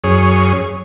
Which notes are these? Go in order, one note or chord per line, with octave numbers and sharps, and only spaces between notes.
F#2 G#4 C#5